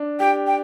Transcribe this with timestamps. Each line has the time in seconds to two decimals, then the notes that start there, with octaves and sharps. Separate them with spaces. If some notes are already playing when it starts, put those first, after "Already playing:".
Already playing: D4
0.20 G4 G5
0.47 G5